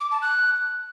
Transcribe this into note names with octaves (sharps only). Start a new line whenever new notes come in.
D6
A5
F#6